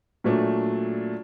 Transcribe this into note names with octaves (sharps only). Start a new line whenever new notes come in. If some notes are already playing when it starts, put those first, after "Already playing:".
A#2 F#3 A3 D4